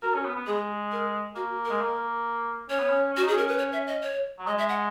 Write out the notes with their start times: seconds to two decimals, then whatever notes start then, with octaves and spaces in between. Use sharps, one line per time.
0.02 F#4 A#4
0.14 C#4
0.25 B3
0.36 B3
0.46 G#3 G#4
0.92 A#4
1.35 A#3 F#4
1.65 G#3 A#4
1.81 A#3
2.69 C#4 C#5
2.79 B3
2.90 C#4
3.13 C#4 F#4
3.23 D#4
3.28 C#4 G#4
3.38 A#4
3.48 B4
3.58 C#5
3.73 E5
3.87 D#5
4.03 C#5
4.39 F#3
4.47 G#3 D#5
4.58 E5
4.69 F#5